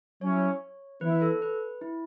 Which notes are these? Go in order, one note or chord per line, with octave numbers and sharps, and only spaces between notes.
F#3 C#4 E4 C#5
E3 B3 E4 B4
A4
B4
E4